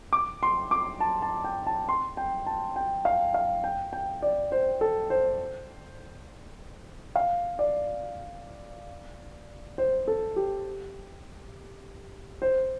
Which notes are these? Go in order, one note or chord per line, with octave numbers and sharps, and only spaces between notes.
D6
C6
D6
A5
A5
G5
A5
C6
G5
A5
G5
F5
F5
G5
G5
D5
C5
A4
C5
F5
D5
C5
A4
G4
C5